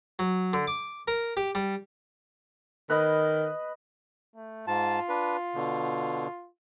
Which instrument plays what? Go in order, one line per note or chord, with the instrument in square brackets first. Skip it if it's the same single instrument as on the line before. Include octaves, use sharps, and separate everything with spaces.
[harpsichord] F#3
D3
D6
A#4
G4
G3
[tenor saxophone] D#3 [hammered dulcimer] B4 D#5 B5
[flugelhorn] A3
[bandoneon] G#2 A5 [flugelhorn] F4
[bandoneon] D4 B4
B2 D3